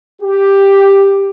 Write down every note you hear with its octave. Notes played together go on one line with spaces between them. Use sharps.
G4